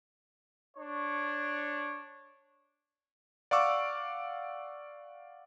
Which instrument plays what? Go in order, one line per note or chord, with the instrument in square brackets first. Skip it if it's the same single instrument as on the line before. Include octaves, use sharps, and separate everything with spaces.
[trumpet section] D4 C#5
[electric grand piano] D5 F5 F#5 C#6 D6 E6